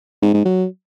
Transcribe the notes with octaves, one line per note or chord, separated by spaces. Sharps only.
G#2
G#2
F#3